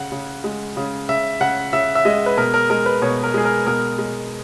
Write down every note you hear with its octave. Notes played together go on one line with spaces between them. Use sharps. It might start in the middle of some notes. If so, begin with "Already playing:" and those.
Already playing: C#3 F#5
C#3
G#3
C#3
C#3 E5
C#3 F#5
C#3 E5
E5
G#3 D#5
B4
B2 A#4
A#4
G#3 A#4
B4
B2 C#5
A#4
G#3 G#4
A#4
B2 A#4
G#3